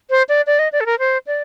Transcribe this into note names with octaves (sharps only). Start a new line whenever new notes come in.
C5
D5
D5
D#5
D5
A4
A#4
C5
D5